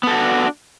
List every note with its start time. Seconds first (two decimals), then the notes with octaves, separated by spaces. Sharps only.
0.03 B3
0.07 A4
0.11 F#4
0.15 D4